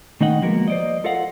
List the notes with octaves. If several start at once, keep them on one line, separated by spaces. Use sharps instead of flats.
D#3 A3 D#4 D#5 F#5 G5
F3 G#3 A#3 B3 F#4 A#4
C5 D5 D#5
F4 A4 A#4 C5 F5 F#5